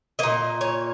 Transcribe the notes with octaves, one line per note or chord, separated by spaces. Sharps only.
A#2 A#3 D#5
C#5